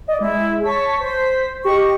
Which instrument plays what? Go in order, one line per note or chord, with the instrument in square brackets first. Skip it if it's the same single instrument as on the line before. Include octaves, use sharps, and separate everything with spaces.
[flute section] D5 [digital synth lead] D#5
[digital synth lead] G#3 [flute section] E4
[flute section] C#5 A5 C#6 [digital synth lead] B6
[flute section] C5
[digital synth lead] G4 [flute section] D#5 C#6